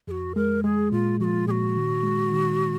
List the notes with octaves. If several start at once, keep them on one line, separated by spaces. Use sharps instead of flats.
F2 F#4 G#4
G#3 A#4
G#3 G#4
A#2 F4
F3 F4 F#4
A#2 F#4 G#4
D#3
G#3
D#3